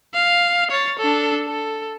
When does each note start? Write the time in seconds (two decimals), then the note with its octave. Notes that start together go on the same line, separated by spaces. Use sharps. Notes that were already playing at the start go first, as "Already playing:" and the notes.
0.14 F5
0.71 C#5 A6
0.99 D4 A4
1.47 A4